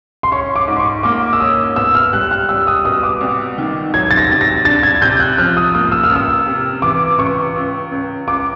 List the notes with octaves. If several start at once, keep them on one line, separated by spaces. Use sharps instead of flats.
C6
C#4 C#6
D6
G#2
C6
C#6
A#3 D6
E6
C#4 D#6
B3 E6
F6
G3 F#6
F6
G3 E6
D#6
B2 D#6
D6
C2
D#3
F#3 G#6
A6
A#6
C3
A#6
D4 A6
G#6
C3 G6
F#6
F3 F6
D#6
A#3 D#6
E6
F6
C#2
E6
C3
E3 D6
C#2 C#6
C#2
C#2
C#2 D6